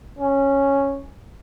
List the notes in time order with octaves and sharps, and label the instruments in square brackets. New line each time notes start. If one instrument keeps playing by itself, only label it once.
[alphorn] C#4